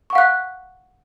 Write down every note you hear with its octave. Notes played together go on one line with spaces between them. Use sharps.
F5 F#5 C#6 F#6